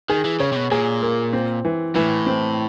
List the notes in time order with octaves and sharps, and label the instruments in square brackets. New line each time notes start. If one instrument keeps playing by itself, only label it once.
[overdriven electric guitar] D#3 [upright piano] G#4
[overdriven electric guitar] E3
[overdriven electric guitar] C#3 [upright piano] C#5
[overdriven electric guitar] C3
B2
[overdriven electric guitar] A#2 [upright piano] G#4
[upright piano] A#3
C4
E3
[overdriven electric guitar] A2 [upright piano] E3
[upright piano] C4